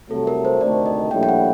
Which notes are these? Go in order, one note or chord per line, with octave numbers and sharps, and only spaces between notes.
C2 C3 F#3 A3 A4
A#4
C5
D2 C3 D#3 A3 D5
D#5
A#1 A2 G3 G5
G5
F#5